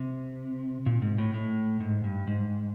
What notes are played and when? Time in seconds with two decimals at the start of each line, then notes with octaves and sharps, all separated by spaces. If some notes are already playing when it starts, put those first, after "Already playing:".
Already playing: C3
0.86 A#2
1.02 G#2
1.18 A2
1.34 A2
1.80 G#2
2.04 G2
2.27 G#2